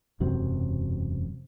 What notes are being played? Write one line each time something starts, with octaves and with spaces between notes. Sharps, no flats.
E1 F#2 C3 F#3